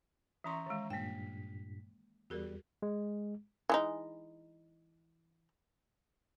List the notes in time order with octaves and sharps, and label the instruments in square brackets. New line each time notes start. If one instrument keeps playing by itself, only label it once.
[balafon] E3 C#4 C6 [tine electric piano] E5 A#5 C#6
[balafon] D#3 G#3
[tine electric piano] G2 A#2 B6 [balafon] A#3 G5
[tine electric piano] E2 G3 [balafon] F#4 G#4 A#4
[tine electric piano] G#3
[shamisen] E3 G#3 D#4